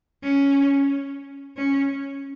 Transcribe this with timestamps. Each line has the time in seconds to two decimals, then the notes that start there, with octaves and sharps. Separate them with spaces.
0.23 C#4
1.57 C#4